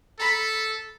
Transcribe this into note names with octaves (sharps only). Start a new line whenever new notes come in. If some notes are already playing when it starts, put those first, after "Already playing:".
A4 A#5 B5